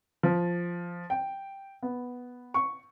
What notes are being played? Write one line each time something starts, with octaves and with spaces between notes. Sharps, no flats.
F3
G5
B3
C#6